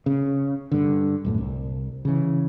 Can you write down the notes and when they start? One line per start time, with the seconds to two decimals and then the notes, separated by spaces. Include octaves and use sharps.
0.06 C#3
0.72 G2 D3
1.25 D#1 F#2 A2
1.38 C2
2.05 C#3 E3